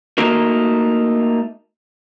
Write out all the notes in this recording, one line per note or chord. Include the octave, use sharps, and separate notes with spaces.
A3 A#3 D#4 F#4 A#4